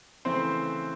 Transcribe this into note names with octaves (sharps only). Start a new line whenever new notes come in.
C#3 E3 A3 C4 C5